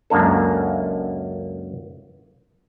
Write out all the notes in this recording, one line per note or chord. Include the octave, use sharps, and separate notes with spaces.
C#2 F#2 A#3 D4 A4